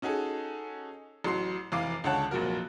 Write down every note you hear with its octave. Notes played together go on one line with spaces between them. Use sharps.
C#4 D#4 F#4 G#4 A4
A1 F#3 C6 C7
F1 E3 F5 D6 C7
C#2 D3 C#5 F#5 A5 F#6
F1 A#1 A#2 F#3 F#4 A#4